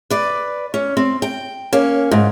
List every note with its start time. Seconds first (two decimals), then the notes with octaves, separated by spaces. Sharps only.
0.10 B4 D5
0.74 C#4
0.97 C4
1.22 G5
1.73 A#3 C#4
2.11 G#2 C#3